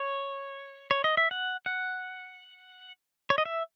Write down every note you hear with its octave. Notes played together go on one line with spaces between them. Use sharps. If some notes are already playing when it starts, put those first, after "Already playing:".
Already playing: C#5
C#5
D#5
E5
F#5
F#5
C#5
D#5
E5